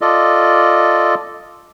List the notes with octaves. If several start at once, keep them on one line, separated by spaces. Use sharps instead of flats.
F4 A4 D5 D#5